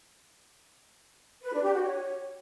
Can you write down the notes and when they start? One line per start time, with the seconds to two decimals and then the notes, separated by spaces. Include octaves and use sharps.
1.43 B4
1.53 D4
1.63 G4
1.73 F#4
1.83 C#5